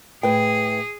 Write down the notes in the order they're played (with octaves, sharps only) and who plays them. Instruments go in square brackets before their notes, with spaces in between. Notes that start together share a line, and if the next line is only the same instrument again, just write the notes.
[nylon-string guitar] A2 B4 G5 [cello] G#4